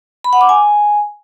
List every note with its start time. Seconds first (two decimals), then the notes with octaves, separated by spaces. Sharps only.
0.24 B5
0.33 F#5
0.41 D6
0.49 G#5